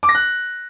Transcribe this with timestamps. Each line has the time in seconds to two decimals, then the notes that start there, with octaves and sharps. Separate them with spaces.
0.03 D6
0.09 A#6
0.15 F#6